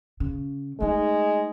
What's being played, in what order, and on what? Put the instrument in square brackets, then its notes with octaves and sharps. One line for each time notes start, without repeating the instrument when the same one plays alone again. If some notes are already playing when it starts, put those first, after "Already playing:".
[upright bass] C#3
[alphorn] G#3 [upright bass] A3 D#4